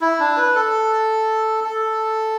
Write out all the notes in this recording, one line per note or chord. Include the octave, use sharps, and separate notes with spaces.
E4
D4
B4
A4
A4